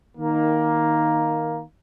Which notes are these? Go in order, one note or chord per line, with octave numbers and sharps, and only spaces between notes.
D#3 A#3